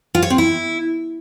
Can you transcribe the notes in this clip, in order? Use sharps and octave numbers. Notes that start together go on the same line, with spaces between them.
F4
C#5
C4
E4